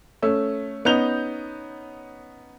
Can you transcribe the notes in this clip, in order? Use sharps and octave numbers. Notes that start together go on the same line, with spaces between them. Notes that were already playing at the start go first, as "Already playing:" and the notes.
A3 C#4 E6
B3 C#4 D#4 G6 F7 G7